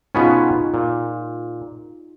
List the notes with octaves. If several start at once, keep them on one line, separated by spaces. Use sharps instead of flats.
B2 B3 C#4 D#4 F4 G#4
A#2